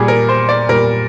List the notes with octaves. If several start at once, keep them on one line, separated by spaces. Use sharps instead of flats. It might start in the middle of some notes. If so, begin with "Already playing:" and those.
Already playing: A#2 G3 G#4
A#4
C5
D5
A#2 G3 A#4